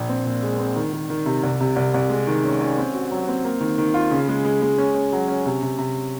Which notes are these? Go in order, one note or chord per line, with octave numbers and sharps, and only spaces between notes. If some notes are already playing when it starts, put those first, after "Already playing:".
Already playing: A#1
C4
A#2
G#3
C4
D#3
D#3
D#3
C3
C2
C3
C2
C2
G#3
D#3
C#4
C#4
C4
F#4
F#3
C4
A#3
D#3
D#3
F4
C#3
G#3
G#3
G#3
C#4
C#4
F#3
C#4
C3
C3
C3